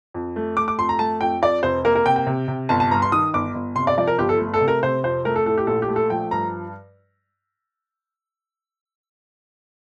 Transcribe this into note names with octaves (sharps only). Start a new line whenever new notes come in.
F2
A3
A3 D6
D6
F2 C6
A#5
A3 A5
F2 G5
F2 D5
F1 C5
A#3 A#4
A#4
C3 G5
G5
C3
C3
G1 A5
A5
G2 A#5
C6
D#3 D#6
G1 D6
G1
C3 C6
D5
F3 D5
A#4
G1 G4
A4
A3
A4
C3
A#4
C3 C5
F2 C5
A3 A#4
A4
A2 A4
G4
A#1 A4
G4
A3
A4
F3 G5
G2 A#5